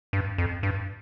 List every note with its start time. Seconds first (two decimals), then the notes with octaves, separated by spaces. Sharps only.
0.13 G2
0.38 F2
0.63 G2